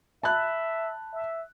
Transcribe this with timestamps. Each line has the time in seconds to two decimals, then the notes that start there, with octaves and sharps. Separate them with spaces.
0.23 E5 A5 B5 F#6
1.13 E5